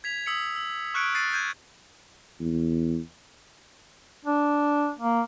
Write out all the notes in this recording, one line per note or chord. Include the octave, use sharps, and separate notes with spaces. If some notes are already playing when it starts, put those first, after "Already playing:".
G#6 B6 F7
D#6 E6 B6 C#7
E6
C#6 F6 F#6 G#6 C#7 D7
A6 C7 D#7
G6 G#6 D#7
E2
D4
A#3